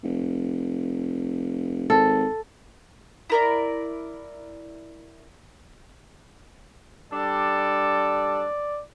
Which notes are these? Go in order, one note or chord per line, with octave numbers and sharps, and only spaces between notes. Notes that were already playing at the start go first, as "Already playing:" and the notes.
F1
G#1 A4
E4 A#4 D5
G3 D4 A4 D5